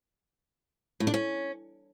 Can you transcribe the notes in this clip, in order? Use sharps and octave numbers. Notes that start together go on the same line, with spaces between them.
A2
D4
C#4